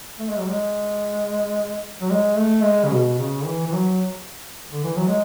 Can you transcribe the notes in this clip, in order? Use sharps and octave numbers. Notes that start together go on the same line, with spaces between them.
A3
G#3
F#3
G#3
F#3
G#3
A3
G#3
C#3
B2
C#3
E3
E3
F#3
D3
E3
F#3
G#3